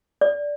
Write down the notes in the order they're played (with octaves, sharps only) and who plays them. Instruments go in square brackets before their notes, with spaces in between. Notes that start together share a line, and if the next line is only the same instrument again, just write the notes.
[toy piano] D5